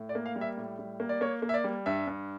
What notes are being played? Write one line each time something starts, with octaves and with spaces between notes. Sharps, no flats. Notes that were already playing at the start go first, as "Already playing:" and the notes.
Already playing: A2
D5
A#3
F5
G3
E5
A2
G3
A#3
D5
A#3 C#5
A#3
E5
D5
G3
G2 E5
G2